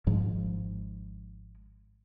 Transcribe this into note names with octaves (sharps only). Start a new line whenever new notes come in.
G#1 G#2 F3 G#3